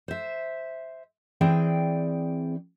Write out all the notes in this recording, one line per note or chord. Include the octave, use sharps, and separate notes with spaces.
C5 E5
E3 C4 G#4 D5 G5